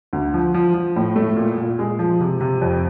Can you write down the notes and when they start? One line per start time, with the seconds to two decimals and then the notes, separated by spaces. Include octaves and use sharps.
0.13 D2
0.34 F3
0.54 F3
0.74 F3
0.96 A2
1.16 A3
1.37 A#2
1.58 A#2
1.79 G#3
1.99 F3
2.20 C3
2.41 C3
2.61 F2